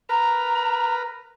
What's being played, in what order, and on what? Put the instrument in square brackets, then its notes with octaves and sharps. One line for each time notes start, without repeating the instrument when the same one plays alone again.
[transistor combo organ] A#4 B4 [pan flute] A#5